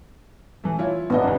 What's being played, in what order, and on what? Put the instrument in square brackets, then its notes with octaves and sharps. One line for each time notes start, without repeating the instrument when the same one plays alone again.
[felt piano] E3 A3
E4 F4 C#5
[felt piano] G#1 D#5 [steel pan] B3 D4
[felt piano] D2 G2